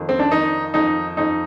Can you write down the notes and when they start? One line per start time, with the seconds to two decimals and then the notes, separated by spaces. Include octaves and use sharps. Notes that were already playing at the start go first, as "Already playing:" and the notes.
Already playing: F2 D#3
0.09 C4
0.19 D4
0.31 D#3 D#4
0.74 F2 D#4
1.17 F2 D#4